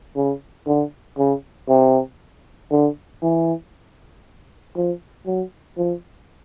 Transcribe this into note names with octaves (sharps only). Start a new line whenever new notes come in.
C#3
D3
C#3
C3
D3
E3
F3
F#3
F3